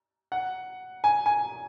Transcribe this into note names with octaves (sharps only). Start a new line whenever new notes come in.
F#5
G#5
G#5